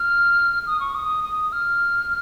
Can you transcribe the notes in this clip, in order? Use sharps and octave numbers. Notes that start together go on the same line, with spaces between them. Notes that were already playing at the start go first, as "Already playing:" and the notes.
Already playing: F6
D#6
C#6
D#6
D#6
F6